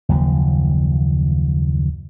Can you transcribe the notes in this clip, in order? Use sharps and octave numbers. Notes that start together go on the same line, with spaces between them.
F#1 D#2 F3